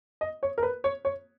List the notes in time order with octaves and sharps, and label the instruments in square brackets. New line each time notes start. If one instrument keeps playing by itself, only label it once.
[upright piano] D#5
C#5
A#4
B4
C#5
C#5